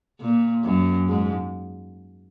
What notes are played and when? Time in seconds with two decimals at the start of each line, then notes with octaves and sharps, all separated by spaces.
0.20 A#2
0.64 F#2
1.08 G#2